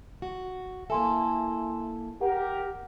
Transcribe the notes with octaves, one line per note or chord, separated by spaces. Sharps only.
F#4
A#3 E4 A4 E5 G#5 C6
G4 A#4 F#5